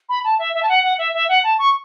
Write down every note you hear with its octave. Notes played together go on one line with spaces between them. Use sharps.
B5
A5
E5
E5
A5
F#5
F#5
E5
E5
F#5
A5
C#6